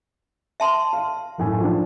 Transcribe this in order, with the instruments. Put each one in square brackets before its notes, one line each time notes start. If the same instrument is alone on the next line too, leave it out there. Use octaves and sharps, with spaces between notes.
[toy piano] E5 A5 C6
[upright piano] F5
F#1 A2 G#5
F3 D4